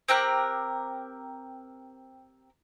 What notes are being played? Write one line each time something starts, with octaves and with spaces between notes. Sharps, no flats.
C4 G4 A#4 F#6